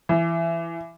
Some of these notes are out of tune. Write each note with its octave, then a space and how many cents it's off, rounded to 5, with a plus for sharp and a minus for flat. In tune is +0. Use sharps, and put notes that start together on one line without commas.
E3 +15